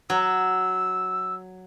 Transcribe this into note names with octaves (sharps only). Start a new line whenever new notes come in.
F#3 E6